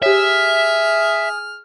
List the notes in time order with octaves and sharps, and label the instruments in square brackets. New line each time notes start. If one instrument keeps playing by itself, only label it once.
[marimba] G4 C#5 [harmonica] G#4 F6 [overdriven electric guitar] E5